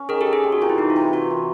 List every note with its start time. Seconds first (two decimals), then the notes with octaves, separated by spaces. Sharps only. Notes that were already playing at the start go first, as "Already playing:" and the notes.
Already playing: C#4
0.09 D#3 G#4 A#4
0.21 G4 A4
0.27 D#3
0.33 G#4
0.44 C3
0.52 F#4
0.62 C3 F4
0.70 E4
0.78 E3 D#4
0.90 F4
0.96 C3
1.02 F4
1.13 C3 F#4
1.30 E3